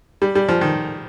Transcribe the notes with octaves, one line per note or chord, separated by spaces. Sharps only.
G3
G3
F3
D#3